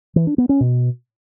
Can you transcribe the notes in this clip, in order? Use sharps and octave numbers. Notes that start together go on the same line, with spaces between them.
E3
D4
B3
C#4
B2